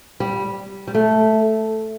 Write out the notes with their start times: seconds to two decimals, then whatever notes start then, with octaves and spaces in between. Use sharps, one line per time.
0.20 G3
0.88 G3
0.95 A3